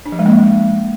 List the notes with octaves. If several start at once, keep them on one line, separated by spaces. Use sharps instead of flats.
D4
F3
G#3
A#3